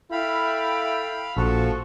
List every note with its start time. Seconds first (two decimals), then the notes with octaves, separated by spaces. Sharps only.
0.11 E4 A4 E5 F5 G5 B5
1.37 A#1 F3 F#4 A4